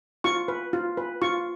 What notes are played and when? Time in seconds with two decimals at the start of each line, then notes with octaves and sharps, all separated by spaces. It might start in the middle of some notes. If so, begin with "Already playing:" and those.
0.24 F4 C#6
0.48 B4
0.73 F4
0.97 B4
1.22 F4 C#6